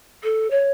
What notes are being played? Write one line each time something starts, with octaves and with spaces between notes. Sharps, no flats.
A4
C#5